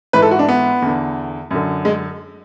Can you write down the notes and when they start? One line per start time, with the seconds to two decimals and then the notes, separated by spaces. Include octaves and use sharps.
0.13 G#2 E3 B4
0.22 A4
0.31 F#4
0.39 D4
0.48 B3
0.82 E2 D3
1.51 F#2 D3
1.85 G#3